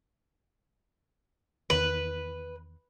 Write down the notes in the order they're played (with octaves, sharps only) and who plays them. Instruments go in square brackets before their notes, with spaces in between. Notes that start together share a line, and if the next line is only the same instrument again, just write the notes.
[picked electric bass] E2 D#3 [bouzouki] B4